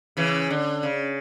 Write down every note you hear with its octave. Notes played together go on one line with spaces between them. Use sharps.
C#3 E3
D3
C#3